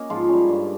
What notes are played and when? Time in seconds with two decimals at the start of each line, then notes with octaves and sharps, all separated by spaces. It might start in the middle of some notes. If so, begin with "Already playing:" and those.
Already playing: A#3 C#4 A#4 D#5
0.10 G#2 F3 F4
0.29 G3 C#4
0.48 G2